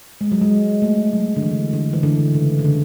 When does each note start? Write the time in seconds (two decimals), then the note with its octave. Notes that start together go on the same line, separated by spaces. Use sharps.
0.21 G#3
0.32 F#3
0.42 G#3
0.82 A3
1.13 F#3
1.36 D3
1.42 E3
1.73 D3
1.93 E3
2.03 D3
2.34 C#3
2.59 C#3
2.64 D3